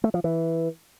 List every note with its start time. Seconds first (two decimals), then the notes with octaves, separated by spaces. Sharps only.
0.04 A3
0.14 F3
0.24 E3